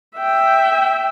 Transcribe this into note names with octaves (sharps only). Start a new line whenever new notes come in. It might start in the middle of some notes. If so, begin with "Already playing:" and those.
E5 G5